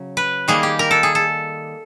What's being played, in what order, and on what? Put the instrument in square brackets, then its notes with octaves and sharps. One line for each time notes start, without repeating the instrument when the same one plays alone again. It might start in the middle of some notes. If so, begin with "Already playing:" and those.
Already playing: [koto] C#3 F#3
B4
D#3 G3 A#3 G#4
G4
A#4
A4
G#4
A4